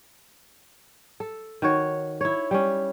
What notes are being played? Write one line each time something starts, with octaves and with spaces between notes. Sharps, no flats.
A4
D#3 F#4 C#5
E4 C#5
G3 C#4